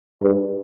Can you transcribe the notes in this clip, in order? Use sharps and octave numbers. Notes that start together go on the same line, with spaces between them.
G2